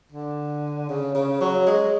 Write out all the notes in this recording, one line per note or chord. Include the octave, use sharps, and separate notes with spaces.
D3
C#3
C#3
F#3
G#3